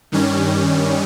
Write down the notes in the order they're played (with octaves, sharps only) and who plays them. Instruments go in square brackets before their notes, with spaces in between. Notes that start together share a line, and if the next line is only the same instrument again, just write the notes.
[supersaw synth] G2 D#3 G3 C#4